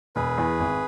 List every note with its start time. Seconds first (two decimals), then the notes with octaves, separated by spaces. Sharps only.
0.16 E1 G#4 B4
0.38 E2
0.60 G#1